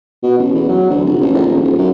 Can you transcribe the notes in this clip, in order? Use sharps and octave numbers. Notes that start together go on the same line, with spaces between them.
B2
A1
E2
F#3
D2
F1
A1
A#1
D#1
D#1
F#2